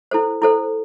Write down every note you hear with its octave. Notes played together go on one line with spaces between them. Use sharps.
E4 A4 C5
E4 A4 C5